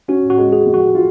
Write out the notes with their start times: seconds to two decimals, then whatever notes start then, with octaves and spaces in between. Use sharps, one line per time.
0.08 C#4 F#4
0.30 F#4
0.38 G#3
0.52 G#4
0.66 F2
0.74 F#4
0.95 F4